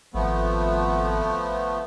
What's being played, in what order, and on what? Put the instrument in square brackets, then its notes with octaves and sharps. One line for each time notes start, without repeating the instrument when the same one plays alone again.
[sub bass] G#1 [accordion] F3 A3 B3